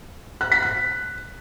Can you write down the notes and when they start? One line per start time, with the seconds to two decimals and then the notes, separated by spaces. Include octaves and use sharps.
0.41 F#6
0.52 B6
0.62 F#6